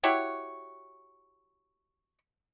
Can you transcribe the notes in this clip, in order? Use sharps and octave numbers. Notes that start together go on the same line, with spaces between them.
E4 F#4 G4 C#5